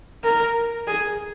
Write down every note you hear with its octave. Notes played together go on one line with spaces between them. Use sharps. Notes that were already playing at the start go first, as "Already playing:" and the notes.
A#4
G#4